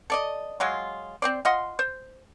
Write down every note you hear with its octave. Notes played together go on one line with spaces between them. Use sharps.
A4 D5 D#5
F#3 G#3 F4
C4 C5 D5
F4 D#5 F#5 C6
C5